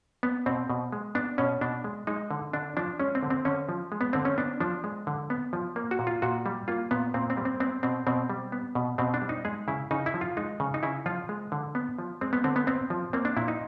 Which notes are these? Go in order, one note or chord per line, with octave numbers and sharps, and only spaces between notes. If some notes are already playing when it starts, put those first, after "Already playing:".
B3
B2 C4
B2
G#3
B3 D4
B2 C#4
B2 D4
G#3
G#3 D#4
D3
D3 D4
F3 D4
G#3 C#4
C4
D3
C4
D3 C#4
F3
G#3
B3
D3 C4
C#4
B3 D4
F3 D4
G#3
D3
B3
F3
A#3
F#4
A#2
F4
A#2 F#4
G3
A#3 F4
A#2 B3
A#2 C4
C4
G3
C4
B3 C4
B2 C4
B2 C4
G3
B3
B2
B2 C4
D4
G3
D#4
G#3 G#4
C#3 E4
C#3 D#4
E4
F3
F4
G#3 D#4
C#3
D#4
C#3 E4
F3 F4
G#3
D3
B3
F3
G#3 C4
B3
D3 C4
B3
B3 C4
F3
A#3 C4
D4
A#2 E4
D#4